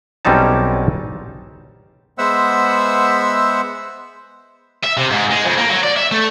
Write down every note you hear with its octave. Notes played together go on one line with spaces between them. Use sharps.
B1 G3 C4 C#4 D#4 A5
G#3 B3 C5 E5 F#5 E6
E5
C3
G#2
G#3
F2
A#3
F#3
D5
E5
A3